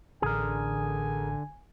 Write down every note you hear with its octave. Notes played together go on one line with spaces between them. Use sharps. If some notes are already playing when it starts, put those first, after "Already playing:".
A1 D3 G#4 A#4 G#5